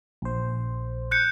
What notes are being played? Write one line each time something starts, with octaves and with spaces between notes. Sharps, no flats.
A#1 C5
F#6 G6 C#7